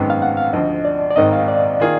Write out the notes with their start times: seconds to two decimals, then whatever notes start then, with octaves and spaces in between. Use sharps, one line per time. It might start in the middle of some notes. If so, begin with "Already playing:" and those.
Already playing: G#1 F#2 D#3 G#3 B3
0.10 F5
0.22 F#5
0.37 F5
0.53 D2 D3 F3 D#5
0.85 D5
1.10 D5
1.16 G#1 G#2 D#3 A#3 D#4 D#5
1.33 F5
1.48 D5
1.80 D#3 A#3 F4 G#4